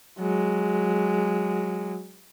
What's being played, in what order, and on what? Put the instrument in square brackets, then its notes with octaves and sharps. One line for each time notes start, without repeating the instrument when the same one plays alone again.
[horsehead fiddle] F#3 G#3